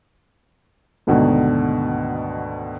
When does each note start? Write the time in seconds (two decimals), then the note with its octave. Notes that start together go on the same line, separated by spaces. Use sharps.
1.07 D2 G#2 B2 D3 D#3